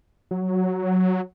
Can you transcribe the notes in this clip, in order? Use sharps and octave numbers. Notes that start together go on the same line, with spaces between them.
F#3